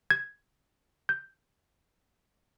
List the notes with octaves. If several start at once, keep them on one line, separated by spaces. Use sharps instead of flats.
G#6
G6